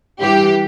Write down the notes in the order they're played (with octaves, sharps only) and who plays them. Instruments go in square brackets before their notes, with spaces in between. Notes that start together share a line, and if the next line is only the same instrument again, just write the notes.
[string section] G2 E3 G4